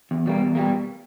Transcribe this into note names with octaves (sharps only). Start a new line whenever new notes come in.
E2
B2 G3 A#3
E2
B2 G3 A#3